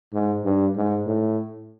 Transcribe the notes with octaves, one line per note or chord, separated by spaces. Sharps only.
G#2
G2
G#2
A2